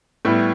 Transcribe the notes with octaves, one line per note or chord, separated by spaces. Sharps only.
A2 G3 B3 E4